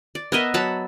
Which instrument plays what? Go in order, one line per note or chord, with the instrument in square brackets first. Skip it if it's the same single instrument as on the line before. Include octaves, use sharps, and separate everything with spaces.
[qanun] D5
B3 A#4 D#5 E5
F#3 F#5 A5 B5